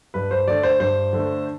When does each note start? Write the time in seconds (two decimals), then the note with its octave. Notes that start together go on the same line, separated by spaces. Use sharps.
0.14 G2 B4
0.31 C5
0.48 D3 A3 D5
0.63 C5
0.80 G2 C5
1.13 D3 A3